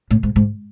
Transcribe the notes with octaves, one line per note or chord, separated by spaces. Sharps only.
A2
G#2
G#2